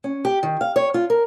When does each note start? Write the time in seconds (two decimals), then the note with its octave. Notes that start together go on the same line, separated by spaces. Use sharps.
0.04 C#4
0.25 G4
0.43 D#3
0.61 F5
0.76 C#5
0.94 F4
1.10 A#4